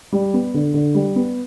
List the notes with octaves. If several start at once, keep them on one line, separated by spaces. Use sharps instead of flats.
G3
B3
D3
D3
G3
B3